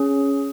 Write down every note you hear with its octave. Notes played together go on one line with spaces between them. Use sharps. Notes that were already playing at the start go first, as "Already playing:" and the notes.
Already playing: C#4 G#4